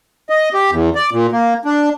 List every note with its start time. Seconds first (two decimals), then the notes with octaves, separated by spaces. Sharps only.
0.30 D#5
0.53 G4
0.71 E2
0.95 D5
1.12 A#2
1.32 A#3
1.65 D4